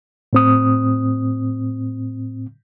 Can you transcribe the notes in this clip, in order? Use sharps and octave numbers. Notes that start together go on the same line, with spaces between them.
A2 C4 D#6